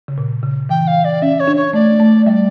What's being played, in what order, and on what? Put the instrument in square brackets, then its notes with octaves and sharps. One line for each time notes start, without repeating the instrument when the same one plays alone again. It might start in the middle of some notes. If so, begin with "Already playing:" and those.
[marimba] C#3
A#2
C#3
[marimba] E3 [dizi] G5
[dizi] F5
D5
[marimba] C#4 [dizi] E5
[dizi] C#5
[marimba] D4
[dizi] C#5
[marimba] A3 [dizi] D5
[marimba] A3
[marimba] G3 [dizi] D5 E5